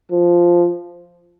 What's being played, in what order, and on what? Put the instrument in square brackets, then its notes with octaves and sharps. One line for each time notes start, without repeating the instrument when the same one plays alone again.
[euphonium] F3